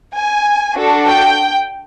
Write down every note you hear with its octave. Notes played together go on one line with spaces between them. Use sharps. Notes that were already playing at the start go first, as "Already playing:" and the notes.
G#5
D4 F#4 A4
G5